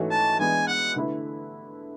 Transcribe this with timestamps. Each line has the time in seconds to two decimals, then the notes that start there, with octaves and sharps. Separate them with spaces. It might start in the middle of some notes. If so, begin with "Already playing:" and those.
Already playing: G#2 E3 A3 C#4 F#4
0.11 A5
0.39 E3 G#3 B3 D4 G#5
0.67 F#5
0.96 D3 A3 E4 B4